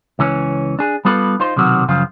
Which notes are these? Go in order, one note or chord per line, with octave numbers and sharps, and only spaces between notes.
C#2 E3 C#4
D4 G#4
G3 B3 F4 A4 B4
D#4 F4 C5
B1 C3 D#3 F#3 F#4
F#2 C#3 F3 F4